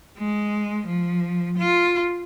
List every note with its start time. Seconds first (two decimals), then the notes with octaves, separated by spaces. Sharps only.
0.18 G#3
0.87 F3
1.58 F4